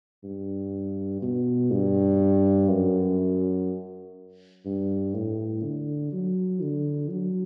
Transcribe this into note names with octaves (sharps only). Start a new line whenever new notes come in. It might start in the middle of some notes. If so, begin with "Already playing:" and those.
G2
B2
G2
F#2
G2
A2
D3
F#3
D3
F#3